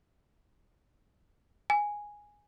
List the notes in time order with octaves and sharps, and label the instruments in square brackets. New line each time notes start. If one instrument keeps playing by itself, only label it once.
[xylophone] G#5